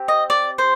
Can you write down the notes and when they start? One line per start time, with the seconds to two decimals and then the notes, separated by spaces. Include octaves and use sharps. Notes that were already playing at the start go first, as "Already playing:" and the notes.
Already playing: C4 G4
0.08 D#5
0.30 D5
0.58 C5